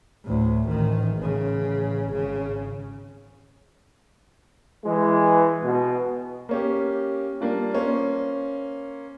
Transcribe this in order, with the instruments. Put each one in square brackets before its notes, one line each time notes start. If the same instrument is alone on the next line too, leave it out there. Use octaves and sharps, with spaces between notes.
[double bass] D2 A2
A1 D#3
A1 C#3
G#1 C#3
[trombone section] E3 G#3
B2
[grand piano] A#3 C#4 G4
G3 A#3 D4 F4
A#3 C#4 C5